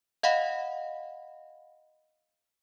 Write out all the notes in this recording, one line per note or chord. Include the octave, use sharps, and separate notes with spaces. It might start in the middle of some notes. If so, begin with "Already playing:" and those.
D#5 F5 F#5 B5